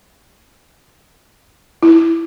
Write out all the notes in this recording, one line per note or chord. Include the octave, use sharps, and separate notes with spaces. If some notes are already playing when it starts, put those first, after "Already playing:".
E4